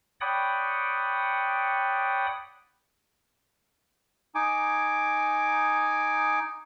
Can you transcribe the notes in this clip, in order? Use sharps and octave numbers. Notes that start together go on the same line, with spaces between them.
C#5 D5 F#5 G5 B5 D#6
D#4 G#5 D6